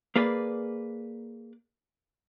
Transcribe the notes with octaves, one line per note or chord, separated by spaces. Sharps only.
A#3 G#4 B4 D5